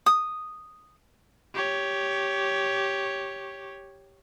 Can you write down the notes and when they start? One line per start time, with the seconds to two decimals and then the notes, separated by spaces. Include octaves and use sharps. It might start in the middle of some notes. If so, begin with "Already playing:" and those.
0.06 D#6
1.54 G4 C#5